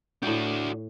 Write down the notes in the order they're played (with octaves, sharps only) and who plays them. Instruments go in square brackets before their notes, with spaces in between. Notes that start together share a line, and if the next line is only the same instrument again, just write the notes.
[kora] A2 G5 [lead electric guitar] D4 F#4